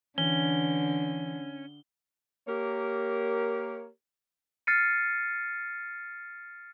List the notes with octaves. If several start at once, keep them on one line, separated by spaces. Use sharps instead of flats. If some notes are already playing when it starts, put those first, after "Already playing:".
D3 E3 C#4 G7
A#3 G4 A#4 C#5
F6 A6 C7 C#7 D#7